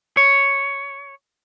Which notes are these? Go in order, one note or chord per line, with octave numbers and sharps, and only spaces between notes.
C#5